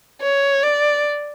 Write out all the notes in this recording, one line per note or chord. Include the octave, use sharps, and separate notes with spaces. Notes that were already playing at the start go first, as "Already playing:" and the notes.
C#5
D5